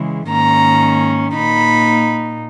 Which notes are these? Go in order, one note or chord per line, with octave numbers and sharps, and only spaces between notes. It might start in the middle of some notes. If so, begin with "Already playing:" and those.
Already playing: C#3 E3 G#3
G#2 D#3 A#3 C#4 A#5
A#2 A#3 D#4 B5